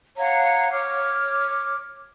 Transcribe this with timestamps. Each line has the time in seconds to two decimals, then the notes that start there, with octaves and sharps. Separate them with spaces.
0.17 C#5 F5 F#5 A#5
0.71 C#5 D6 F6